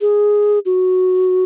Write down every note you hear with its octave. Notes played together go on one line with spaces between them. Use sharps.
G#4
F#4